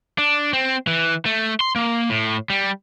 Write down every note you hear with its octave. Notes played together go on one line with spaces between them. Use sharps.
D4
C4
E3
A3
C6
A#3
A2
G3